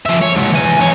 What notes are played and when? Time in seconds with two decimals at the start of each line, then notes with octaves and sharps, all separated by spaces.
0.06 F3 E5
0.22 C#5
0.36 G#2 C3
0.52 E2 G#5
0.79 B1 C#5